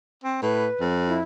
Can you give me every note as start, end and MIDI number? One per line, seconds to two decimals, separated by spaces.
0.24 0.41 60
0.42 0.68 45
0.42 0.83 71
0.80 1.21 41
1.07 1.23 64